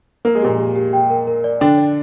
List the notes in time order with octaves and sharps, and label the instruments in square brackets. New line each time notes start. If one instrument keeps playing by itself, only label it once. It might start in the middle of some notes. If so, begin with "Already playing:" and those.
[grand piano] A#3 [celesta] A#4
[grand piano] G#3
[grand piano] A#2 A#3 [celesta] G4
[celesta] G4
G4
G5
A#4
A#4
D5
[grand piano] D3 D4 [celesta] G5
[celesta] D5